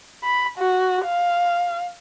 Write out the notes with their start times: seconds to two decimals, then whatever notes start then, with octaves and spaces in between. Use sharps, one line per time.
0.24 B5
0.58 F#4
1.05 F5